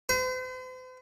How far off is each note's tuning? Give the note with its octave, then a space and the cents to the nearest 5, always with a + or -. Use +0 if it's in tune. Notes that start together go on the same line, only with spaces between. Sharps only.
C5 -45